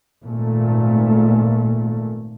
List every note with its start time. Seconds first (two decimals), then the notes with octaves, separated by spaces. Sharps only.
0.24 G#1 A#2 A3